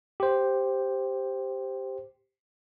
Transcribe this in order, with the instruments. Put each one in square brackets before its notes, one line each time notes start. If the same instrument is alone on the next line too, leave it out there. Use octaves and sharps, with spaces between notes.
[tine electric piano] G4 C5